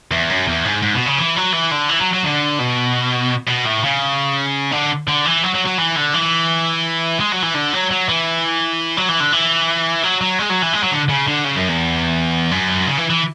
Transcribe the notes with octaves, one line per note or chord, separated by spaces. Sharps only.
E2
F#2
E2
G#2
G#2
B2
C#3
E3
F#3
E3
D3
E3
F#3
F#3
D3
B2
B2
A2
C#3
D3
D3
E3
F#3
F#3
F#3
E3
D3
E3
G#3
F#3
E3
D3
F#3
F#3
E3
F#3
E3
D3
E3
F#3
F#3
G#3
F#3
E3
G#3
F#3
D3
C#3
D3
C#3
F#2
E2
F#2
C#3
E3
E3